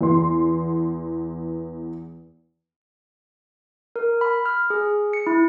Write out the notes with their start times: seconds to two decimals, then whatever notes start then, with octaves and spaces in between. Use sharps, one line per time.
0.01 E2 B3 C6
3.96 A#4
4.21 B5
4.46 F6
4.70 G#4
5.13 C#7
5.27 E4